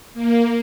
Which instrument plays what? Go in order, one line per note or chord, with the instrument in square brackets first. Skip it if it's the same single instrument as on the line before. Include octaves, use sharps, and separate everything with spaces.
[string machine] A#3